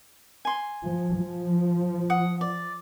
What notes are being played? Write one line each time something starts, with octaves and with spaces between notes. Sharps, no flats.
G#5 C6
F3
F3
F#5 D#6
D5